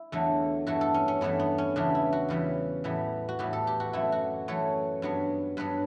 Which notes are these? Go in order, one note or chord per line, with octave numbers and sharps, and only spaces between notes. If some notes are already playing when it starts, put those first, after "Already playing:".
Already playing: E4
E2 D3 F#3 A3
G2 E3 A3 F#4
A4
C#4
C#4
G2 E3 A3 B3
B3
C#4
E2 C#3 E3 G3 B3 D4
E4
F#4
E2 C#3 E3 G3 B3
A2 E3 G3 B3
F#4
A2 E3 G3 B3 G4
A4
G4
F#4
F#2 E3 A3 E4
F#4
F#2 E3 A3 C#5
G2 F#3 B3
G2 F#3 B3 B4